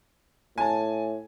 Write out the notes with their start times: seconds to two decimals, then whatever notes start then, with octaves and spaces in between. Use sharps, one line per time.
0.58 A2 G#5 A5